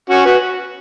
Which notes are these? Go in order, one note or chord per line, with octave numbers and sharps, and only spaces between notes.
C#4 F#4
F#4 B4